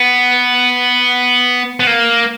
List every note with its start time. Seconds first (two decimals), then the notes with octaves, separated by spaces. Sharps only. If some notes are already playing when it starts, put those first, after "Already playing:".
Already playing: B3
1.80 B3
1.87 A#3